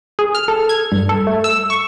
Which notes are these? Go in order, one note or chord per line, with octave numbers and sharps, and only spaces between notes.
G#4
F6
A4
G#6
G2
A4
A3
E6
C#6